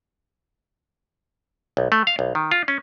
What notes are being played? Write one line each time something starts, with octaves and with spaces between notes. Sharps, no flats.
B1
A3
F5
B1
D#3
F4
C#4